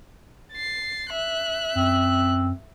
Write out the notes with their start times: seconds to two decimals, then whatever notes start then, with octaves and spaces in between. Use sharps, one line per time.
0.53 A6 C7
1.09 E5 F#6
1.75 F#2 C4